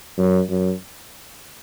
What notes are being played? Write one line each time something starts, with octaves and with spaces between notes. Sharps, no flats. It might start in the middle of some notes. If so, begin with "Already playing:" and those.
F#2
F#2